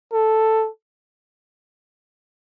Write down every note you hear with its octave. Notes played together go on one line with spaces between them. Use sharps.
A4